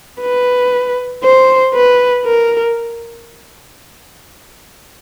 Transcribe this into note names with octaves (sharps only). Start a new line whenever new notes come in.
B4
C5
B4
A#4